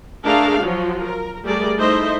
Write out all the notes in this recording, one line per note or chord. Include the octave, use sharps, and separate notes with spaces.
A3 D4 G#4 A#4 F5
F3 F#3 F4 F#4
A#4
G3 A3 G#4 A#4 D5
A3 D#4 E4 C5 D#5 E5